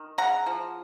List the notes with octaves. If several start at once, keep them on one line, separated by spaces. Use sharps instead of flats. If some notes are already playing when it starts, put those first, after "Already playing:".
Already playing: D#3
C#3 F#5 A#5
F3